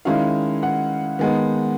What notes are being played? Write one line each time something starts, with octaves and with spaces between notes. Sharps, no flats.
D#3 G#3 C#4 E4 F5
F#5
D#3 G#3 B3